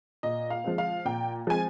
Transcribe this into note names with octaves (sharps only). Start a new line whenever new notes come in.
A#2 D#5
F5
F3 G#3 C4
F5
A#2 G5
F3 G#3 C4 G#5